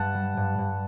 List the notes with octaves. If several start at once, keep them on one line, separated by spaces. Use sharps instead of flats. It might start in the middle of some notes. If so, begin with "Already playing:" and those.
Already playing: G2 F#5 A5
G3
G2
G2